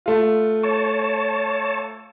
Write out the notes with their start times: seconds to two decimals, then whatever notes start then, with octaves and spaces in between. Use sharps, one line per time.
0.06 A3 F4
0.63 C#5 A5